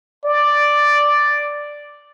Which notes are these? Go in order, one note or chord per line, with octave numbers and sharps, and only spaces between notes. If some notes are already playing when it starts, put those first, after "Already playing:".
D5